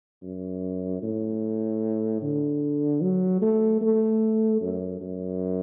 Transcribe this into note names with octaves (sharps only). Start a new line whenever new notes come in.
F#2
A2
D3
F#3
A3
A3
F#2
F#2